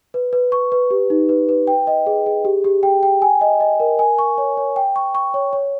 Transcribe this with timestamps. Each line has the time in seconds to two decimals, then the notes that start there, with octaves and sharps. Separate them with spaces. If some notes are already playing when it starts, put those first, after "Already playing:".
0.14 B4
0.33 B4
0.52 C#6
0.72 B4
0.91 G4
1.10 D#4
1.29 B4
1.49 B4
1.67 G5
1.87 D#5
2.07 G#4
2.26 G#4
2.45 G4
2.64 G4
2.83 G5
3.03 G5
3.22 G#5
3.41 D#5
3.61 D#5
3.80 A#4
3.99 G#5
4.19 C#6
4.38 C#5
4.57 C#5
4.76 G5
4.96 C#6
5.15 C#6
5.34 C#5
5.53 C#5